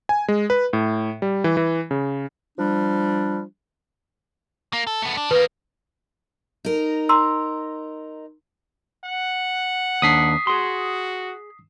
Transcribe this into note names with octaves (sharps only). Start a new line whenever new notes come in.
G#5
G#3
B4
A2
G3
E3
E3
C#3
F3 G3 D4
A#3
A4
A3 B3
D4
D#3 A#3 B4
D#4 A#4
A#5 C6 E6
F#5
D#2 D4 D#6 B6 C7
F#4 G#4 C6